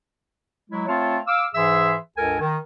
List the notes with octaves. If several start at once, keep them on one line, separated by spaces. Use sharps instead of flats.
F#3 G#3 E4
A3 C4 F4 C#5 F5 A5
F5 D6 E6
G#2 E3 G#4 E5 C6 E6
C#2 G2 A4 A#4 G#5
D#3